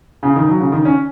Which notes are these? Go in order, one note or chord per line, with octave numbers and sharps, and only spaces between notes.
C#3
D#3
F#3
C#3
D#3
C#4